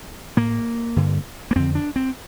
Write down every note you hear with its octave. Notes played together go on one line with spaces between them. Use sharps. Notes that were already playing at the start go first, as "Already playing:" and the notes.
A2 A#3
G2 D3
A#3
F2 D3 C4
D4
C4